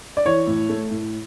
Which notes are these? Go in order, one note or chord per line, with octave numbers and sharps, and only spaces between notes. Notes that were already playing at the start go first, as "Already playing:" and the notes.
D5
E3 C#5
A2
A3
A2